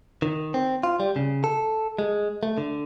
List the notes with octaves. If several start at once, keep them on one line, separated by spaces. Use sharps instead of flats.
D#3
C4
F4
G3
C#3
A4
G#3
A3
D3